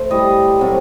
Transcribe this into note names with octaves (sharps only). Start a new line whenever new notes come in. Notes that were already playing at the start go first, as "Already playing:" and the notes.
Already playing: A3 C5
A2 G3 D#5
C3 F#3 A3